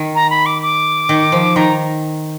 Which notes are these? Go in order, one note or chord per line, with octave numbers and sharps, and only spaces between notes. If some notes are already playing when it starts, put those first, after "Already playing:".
Already playing: D#3
A#5
B5
D6
D6
D#3
F3
D#3 A#5